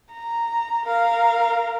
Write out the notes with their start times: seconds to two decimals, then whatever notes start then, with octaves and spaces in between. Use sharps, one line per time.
0.11 A#5
0.84 A#4 F5